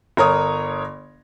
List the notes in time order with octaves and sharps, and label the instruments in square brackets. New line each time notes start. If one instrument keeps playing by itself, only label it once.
[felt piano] G1 A#4 C#5 D#6